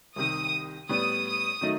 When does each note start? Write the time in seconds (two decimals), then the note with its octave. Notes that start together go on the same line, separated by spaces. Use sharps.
0.16 C2 C3 D#3 D#6
0.89 A2 G3 B3 D#6
1.26 D#6
1.61 D#3 F#3 A3 D#4